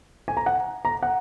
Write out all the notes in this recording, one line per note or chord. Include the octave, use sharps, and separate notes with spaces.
G#5
A#5
F#5
A#5
F#5